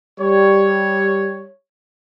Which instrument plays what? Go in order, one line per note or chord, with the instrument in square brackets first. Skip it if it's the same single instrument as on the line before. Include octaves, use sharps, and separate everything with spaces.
[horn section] G3 C#5